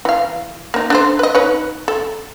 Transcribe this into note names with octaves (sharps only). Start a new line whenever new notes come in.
E3 F5
A#3 D#4
D4 A4 C5
B4 D#5
D#4 B4 C#5
A4